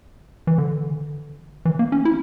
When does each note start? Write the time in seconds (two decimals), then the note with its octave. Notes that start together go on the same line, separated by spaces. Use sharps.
0.47 E3
0.58 D3
1.65 E3
1.79 A#3
1.92 C#4
2.05 E4